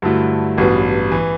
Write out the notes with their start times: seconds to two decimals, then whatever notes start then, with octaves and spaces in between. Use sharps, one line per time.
0.02 G2 D3 F#3 A3 E4
0.58 A1 G2 F#3 B3
1.12 E3